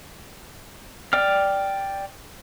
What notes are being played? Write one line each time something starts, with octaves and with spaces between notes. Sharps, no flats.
D5 G5 F6